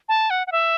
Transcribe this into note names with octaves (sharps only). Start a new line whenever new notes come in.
A5
F#5
F#5
E5